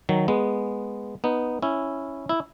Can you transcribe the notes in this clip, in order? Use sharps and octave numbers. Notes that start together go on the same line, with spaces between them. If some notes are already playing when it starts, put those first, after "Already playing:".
D#3 F#3
G#3 B3
B3 D#4
C#4 E4
E4